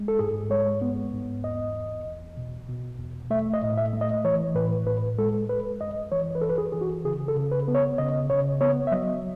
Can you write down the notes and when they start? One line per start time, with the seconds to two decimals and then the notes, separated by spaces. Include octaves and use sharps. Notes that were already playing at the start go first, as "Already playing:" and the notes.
Already playing: G#3
0.08 A4
0.19 G#2 G#4
0.50 G#3 C#5
0.82 B3
1.13 G#2
1.44 E2 D#5
1.75 E2
2.06 E2
2.37 B2
2.69 B2
2.99 E2
3.30 A3 E5
3.54 D#5
3.62 A2
3.77 E5
3.93 A3
4.01 D#5
4.24 E3 C#5
4.55 A2 B4
4.86 A2 B4
5.18 G#3 A4
5.49 G#3 B4
5.81 F#2 D#5
6.12 E3 C#5
6.35 B4
6.41 F#2 A4
6.49 B4
6.58 G#4
6.72 E3 G#4
6.81 F#4
7.05 C#3 G#4
7.28 A4
7.36 C#3
7.52 B4
7.68 B3
7.75 C#5
7.98 C#3 D#5
8.30 C#3 C#5
8.61 B3 C#5
8.87 E5
8.92 F#3 D#5